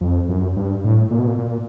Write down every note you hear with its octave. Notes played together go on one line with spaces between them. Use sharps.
F2
F#2
G2
A2
A#2
B2
A#2
A#2